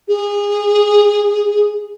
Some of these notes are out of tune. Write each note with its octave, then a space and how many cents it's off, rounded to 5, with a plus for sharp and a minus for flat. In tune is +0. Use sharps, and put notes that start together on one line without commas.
G#4 -25